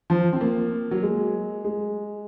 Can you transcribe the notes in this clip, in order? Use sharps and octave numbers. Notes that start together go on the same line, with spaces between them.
F3
C4
A#3
F#3
G#3
G#3